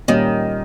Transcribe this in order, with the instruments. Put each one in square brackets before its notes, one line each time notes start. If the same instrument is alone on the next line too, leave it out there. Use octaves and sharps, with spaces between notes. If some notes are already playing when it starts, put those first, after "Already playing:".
[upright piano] A#2 G3 C#4 [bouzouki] D#3